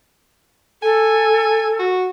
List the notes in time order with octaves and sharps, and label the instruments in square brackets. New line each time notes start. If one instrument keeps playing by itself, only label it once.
[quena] A4 [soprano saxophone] G#5
[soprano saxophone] F#4